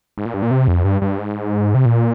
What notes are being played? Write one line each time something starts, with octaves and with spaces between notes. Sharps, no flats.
G#2
A#2
G2
A#2
C3
F2
G2
G2
G#2
C3
A#2